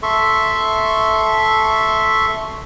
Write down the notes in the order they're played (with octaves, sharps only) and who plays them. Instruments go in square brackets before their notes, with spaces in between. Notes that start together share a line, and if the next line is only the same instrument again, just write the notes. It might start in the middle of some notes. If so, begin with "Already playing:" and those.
[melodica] A4 E5 C6 C#6